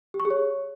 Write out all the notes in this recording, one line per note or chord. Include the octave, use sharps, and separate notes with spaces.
G4
C#6
G#4
C#5